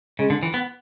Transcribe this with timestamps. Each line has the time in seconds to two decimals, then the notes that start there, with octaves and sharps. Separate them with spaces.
0.19 C#3 G#3
0.30 D3
0.43 E3
0.54 B3